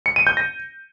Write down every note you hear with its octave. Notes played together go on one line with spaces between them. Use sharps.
C#7
D#7
G6
A#6